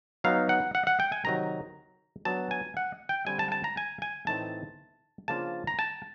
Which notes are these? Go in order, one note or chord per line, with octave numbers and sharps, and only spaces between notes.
F#3 B3 D#4 F5
F#5
F#5
F#5
G5
G#5
C3 D#3 F#3 A#5
F#3 B3 D4 A5
G#5
F#5
G5
D3 G3 C4 G#5
A5
A5
A#5
G#5
G#5
A2 E3 A3 C4 D#4 A5
C#3 F3 A#3 D4 F4 A5
A#5
A5